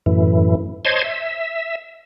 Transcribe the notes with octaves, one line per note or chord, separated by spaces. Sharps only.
F#2 A2 E3
C5 C#5 D#5 A5 C6 G#6
E5